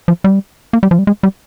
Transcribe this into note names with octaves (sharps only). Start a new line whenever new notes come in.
F3
G3
A#3
G3
F3
G3
G#3
G3